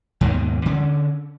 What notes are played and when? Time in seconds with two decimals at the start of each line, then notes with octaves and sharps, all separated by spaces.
0.21 D#2 G#2 B2 D#3
0.66 D3 C#4